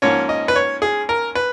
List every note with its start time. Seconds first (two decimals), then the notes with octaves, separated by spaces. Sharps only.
0.02 G#2 F3 A#3 C#4 C#5
0.29 D#5
0.48 B4
0.56 C#5
0.82 G#4
1.09 A#4
1.35 B4